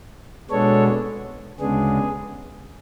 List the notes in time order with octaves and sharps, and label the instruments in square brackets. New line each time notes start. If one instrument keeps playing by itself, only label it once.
[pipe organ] B2 G#3 B3 D4 A4 C#5
D2 C#3 G#3 B3 D4 G#4